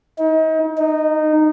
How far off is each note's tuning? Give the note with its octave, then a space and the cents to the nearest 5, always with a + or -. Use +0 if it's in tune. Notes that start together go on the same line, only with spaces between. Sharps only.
D#4 +35
D#4 -15